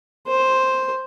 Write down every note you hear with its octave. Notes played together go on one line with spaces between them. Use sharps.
C5